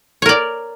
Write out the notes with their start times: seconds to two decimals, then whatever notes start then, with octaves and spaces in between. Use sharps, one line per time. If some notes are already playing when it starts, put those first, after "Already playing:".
0.22 C#5
0.26 A#4
0.29 D5